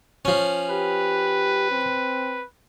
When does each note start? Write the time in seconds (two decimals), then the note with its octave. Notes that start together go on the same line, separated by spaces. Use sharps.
0.25 F3 C#4
0.70 G4 B4
1.71 C4